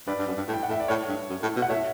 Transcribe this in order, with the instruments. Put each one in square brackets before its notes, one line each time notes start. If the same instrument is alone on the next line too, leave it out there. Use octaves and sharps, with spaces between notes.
[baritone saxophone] G2 [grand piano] B4 D5
[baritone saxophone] G2
F#2
G2
A2
[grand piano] G5
F#5
[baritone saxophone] A2 [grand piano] E5
[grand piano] D5
[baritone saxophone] A2 [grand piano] A4 C#5
[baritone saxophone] G2
F#2
A2
B2
[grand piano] F#5
[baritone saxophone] A2 [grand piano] C#5 E5